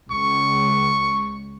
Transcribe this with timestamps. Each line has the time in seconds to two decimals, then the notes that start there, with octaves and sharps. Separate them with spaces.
0.11 C#2 C#6